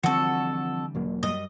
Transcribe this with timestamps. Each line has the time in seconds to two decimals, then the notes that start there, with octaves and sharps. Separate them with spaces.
0.03 D3 E3 F3 G3 C4 F#4 A4
0.95 E1 F#3 A#3
1.23 F#2 G3 D#5